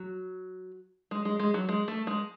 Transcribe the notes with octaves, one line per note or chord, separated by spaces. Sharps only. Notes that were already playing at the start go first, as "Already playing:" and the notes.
Already playing: F#3
G#3
G#3
G#3
F#3
G#3
A3
G#3